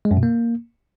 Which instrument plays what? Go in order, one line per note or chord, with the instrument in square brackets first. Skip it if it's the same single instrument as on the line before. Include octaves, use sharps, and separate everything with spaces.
[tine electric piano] G#3
F#2
B2
A#3